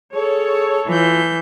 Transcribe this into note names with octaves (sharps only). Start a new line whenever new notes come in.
G#4 A4 C#5
E3 F4 G6